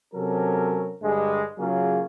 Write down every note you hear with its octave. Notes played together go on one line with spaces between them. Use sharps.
C3 F#3 C#4 A4 A#4
G2 D3 G3 G#3
C#3 F#3 A#3 F4 G#4